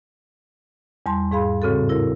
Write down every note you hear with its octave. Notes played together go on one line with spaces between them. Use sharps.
E2 G3 A5 C6
G#2 G#4 F5 B5
A2 C#3 C4 F#4 A4
E4 A#4